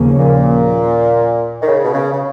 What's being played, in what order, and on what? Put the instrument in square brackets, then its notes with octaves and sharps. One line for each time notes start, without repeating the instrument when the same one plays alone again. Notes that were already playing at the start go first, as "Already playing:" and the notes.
Already playing: [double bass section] D#2 C#3 F3 A#3 C#4
[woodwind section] A#2
D#3
C#3
B2
C#3
C#3